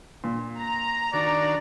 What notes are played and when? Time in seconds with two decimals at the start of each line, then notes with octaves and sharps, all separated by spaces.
0.24 A#2
0.58 A#5
1.14 D#3 D4 F#4 D5